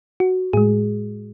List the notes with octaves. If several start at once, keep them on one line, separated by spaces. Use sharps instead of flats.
F#4
A2 G#3 G#4